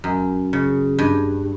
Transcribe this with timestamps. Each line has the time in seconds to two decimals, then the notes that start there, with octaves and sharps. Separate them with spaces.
0.04 F#2
0.53 C#3
0.99 G2